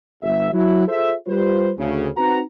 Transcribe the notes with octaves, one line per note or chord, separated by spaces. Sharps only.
G1 E5
F#3 E4
F4 G#4 A4 C5 E5
G3 F4 B4 C5
D2 C#3
C4 D#4 F#4 B4 F#5 A#5